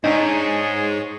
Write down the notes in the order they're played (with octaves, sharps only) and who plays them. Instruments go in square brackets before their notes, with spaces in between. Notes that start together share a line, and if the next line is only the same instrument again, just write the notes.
[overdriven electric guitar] G#2 [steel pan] D4 D#4 [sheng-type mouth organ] G#4 C#5 [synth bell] D#5 A#5